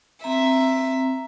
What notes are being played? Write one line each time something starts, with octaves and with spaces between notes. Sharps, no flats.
C4 E5 A#5